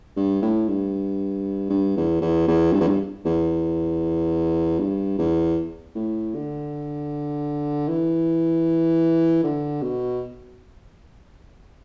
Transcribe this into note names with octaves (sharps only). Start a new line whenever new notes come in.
G2
A2
G2
G2
E2
E2
E2
G2
E2
G2
E2
G2
E2
A2
D3
E3
D3
B2